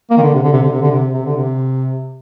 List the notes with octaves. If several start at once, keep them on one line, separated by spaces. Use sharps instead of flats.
A#3
D#3
D3
C3
D3
C3
D3
C3
D3
C3
C3
D3
C3